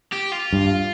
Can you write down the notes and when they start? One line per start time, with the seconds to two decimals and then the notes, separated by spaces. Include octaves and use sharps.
0.13 G4
0.32 F4
0.53 G2